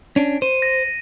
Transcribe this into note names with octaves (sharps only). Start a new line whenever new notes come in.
C#4 D4
C5 D#7
A#6